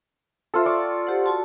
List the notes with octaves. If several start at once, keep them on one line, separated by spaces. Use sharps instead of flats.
F4 A4 C5 E5
D5 G5 C#6
G4 C5 F#5
F#4 A5 C6